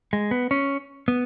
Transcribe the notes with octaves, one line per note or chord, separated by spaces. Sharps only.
G#3
B3
C#4
B3